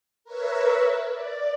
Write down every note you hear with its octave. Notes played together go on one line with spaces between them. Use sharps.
A#4 B4 C#5 E5
D5